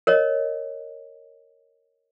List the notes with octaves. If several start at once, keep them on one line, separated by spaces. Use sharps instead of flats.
A#4 C#5 D#5